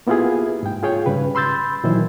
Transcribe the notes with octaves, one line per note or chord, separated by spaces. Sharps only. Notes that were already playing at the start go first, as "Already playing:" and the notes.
A#3 B3 E4 F4 G4 G#4
G#2 G5
F4 G#4 C#5 G5
G#2 C#3 G3 B4
B5 C6 E6 G6 A6
A#2 D#3 E3 F#3 E4 C5